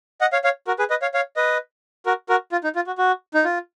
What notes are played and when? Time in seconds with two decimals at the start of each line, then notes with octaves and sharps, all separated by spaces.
0.21 D#5 F#5
0.32 C#5 F5
0.44 C#5 F5
0.67 F#4 A#4
0.79 G#4 B4
0.90 B4 D#5
1.02 C#5 F5
1.14 C#5 F5
1.36 B4 D#5
2.06 F#4 A#4
2.29 F#4 A#4
2.52 F4
2.64 D#4
2.76 F4
2.87 F#4
2.98 F#4
3.34 D#4
3.45 F4